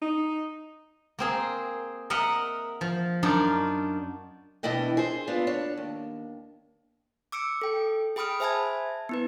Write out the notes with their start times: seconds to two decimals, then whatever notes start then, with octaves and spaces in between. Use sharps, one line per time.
0.02 D#4
1.19 A#3 C4 G#4
2.10 A#4 D#5 E5 F#5
2.81 F3
3.23 F#2 D4 D#4 F4
4.63 B2 E3 D4 E4 D#5 G5
4.97 G#4 C5
5.27 B3 D4 E4 F4
5.47 D4 C#5
5.77 D#2
7.32 D6 E6 C#7 D7
7.62 A4 G5
8.16 G#4 G5 B5 D#6 F6 D7
8.40 C5 E5 G#5 A5 B5 G#6
9.09 B3 E4 B4